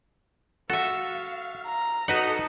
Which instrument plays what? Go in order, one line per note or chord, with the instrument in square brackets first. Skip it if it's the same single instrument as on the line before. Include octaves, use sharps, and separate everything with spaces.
[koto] F#4 E5 [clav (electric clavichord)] A4 [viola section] F5
[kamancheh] A#5
[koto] D#4 [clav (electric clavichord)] F#4 B4 F#5 [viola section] A4 D#5 A5